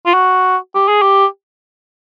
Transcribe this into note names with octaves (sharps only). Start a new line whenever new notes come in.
F4
F#4
G4
G#4
G4